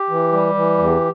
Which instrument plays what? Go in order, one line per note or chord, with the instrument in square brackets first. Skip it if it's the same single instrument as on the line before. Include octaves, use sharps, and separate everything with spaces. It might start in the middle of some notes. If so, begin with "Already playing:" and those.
Already playing: [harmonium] G4
E3
G3
E3
E2